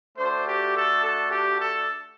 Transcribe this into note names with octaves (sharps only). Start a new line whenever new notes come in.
A3 D4 F#4 C5
G4
A4
A4
G4
A4